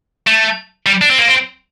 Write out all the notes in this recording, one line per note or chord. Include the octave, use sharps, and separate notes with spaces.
A3
G3
D4
C4
A#3
C4